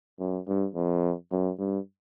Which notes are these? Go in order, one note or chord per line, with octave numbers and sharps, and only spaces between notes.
F#2
G2
F2
F#2
G2